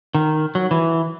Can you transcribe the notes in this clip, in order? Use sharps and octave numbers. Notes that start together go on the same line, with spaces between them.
D#3
F#3
E3